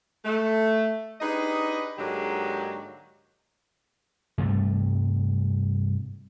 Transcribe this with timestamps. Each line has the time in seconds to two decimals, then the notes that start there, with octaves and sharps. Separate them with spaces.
0.25 A3
1.21 D4 D#4 G4 G#4 B4 D#5
1.98 G#2 D3 F#3 G#3 A#3 G4
4.38 G2 C3 G3 A3